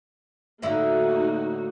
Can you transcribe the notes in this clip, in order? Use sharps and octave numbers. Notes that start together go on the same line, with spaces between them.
A2 D3 A#3 D#4 E4 F#4